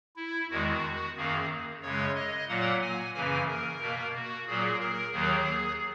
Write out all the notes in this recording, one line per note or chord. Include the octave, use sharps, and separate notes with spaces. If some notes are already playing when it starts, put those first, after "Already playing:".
E4
E2 D#3 G#3 F#4
F#2 D#3 A#3 G#4
F#2 C#3 G#3 C#5
D#5
A#2 F#3 A#3 F#5
G#5
F#2 C#3 E3 A#3 G#5
A#4
B2 A#3
F#4
A#2 F#3 A#3 G#4
A#4
D#2 D#3 F#3 A#3 G#4